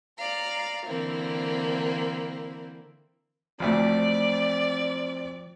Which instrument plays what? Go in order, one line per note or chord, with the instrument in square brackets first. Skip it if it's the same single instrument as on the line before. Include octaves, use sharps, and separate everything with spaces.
[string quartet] D5 F5 A#5
D3 E3 A#3 C4 E4
[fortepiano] A1 D2 A3 [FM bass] F3 [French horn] C4 [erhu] D5